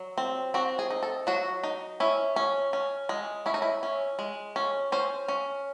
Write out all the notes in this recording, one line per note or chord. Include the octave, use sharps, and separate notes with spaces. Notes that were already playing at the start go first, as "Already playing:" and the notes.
Already playing: F#3
C4
C4 F#4
G#4
D#4
A4
F#3 F#4
D#4
C#4 E4
C#4
C#4
G#3
C#4 E4
D#4
E4
C#4
G#3
C#4
C#4 C5
C#4